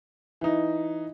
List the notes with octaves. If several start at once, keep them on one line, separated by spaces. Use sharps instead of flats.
E3 D#4